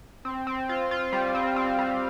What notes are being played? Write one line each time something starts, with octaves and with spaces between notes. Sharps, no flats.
C4
C4
F4
F4
G3
C4
C4
G3